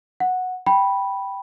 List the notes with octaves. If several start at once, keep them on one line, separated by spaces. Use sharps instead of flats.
F#5
G5 B5